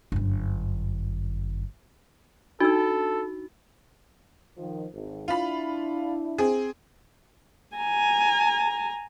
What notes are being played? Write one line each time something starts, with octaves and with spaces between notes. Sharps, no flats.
G1 F#2
D4 D#4 F#4 A4 E6
D#3 F3
G#1
D4 E4 F4 B5
C4 G#4
G#5 A#5